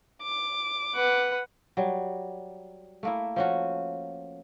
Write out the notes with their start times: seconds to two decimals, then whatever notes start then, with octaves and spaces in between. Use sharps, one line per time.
0.23 D6
0.95 B4 F#5
1.77 F#3 G3
3.03 A3 A#3 E4
3.36 F3 C#4 F#4